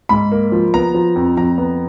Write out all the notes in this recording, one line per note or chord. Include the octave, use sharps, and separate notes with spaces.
G#2 B5
A#3
F3
B3 A#5
F3
F2
F2 A#5
B3